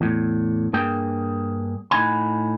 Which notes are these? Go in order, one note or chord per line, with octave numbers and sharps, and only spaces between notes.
E2 A2
G2 A#3 G#4 G5
A2 D#4 F#5 G#5 B5